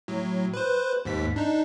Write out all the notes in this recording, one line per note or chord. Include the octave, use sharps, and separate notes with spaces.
A2 F#3
B4 C5
D#2 G#2 B6
D4 D#4